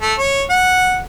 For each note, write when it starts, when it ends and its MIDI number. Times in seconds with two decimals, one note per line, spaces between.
0.02 0.14 57
0.18 0.43 73
0.50 0.99 78